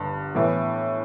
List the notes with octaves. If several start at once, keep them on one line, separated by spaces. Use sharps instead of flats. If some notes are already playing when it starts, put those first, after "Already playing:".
Already playing: G1 G2 D3 G3
A2 E3 B3